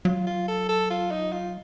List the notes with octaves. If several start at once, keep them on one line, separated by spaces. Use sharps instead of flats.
F#3 F4
F4
A4
A4
F4
D#4
F4